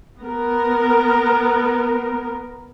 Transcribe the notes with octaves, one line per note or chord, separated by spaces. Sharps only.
B3 A#4